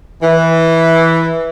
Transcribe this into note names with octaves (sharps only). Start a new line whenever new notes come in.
E3